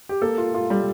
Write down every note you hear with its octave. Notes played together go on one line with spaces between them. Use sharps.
G4
A#3 A4
F4
F4
G3